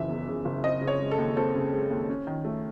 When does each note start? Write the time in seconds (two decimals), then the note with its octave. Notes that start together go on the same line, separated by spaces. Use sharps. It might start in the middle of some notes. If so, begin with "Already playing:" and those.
Already playing: F#1 C#3 E3 E5
0.09 E2
0.27 C#3
0.45 F#1
0.63 C4 D#5
0.81 C#3
0.87 C#5
1.00 G#3
1.11 A4
1.18 D#2
1.37 C4 A4
1.55 C#3
1.73 G#3
1.91 D#2
2.09 C#4
2.27 D#3
2.45 A3